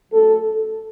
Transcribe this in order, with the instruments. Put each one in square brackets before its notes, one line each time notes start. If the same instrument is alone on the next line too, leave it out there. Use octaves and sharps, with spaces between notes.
[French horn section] F#2 F#3 A3 A4